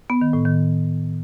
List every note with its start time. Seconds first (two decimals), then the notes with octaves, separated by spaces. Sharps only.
0.10 B3
0.21 D#3
0.33 A2
0.45 D#3